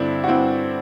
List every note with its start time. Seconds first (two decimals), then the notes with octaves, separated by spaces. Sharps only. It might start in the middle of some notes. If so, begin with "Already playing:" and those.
Already playing: G2 D3 C4 D4 E4
0.24 F#4
0.28 G2 C4 E4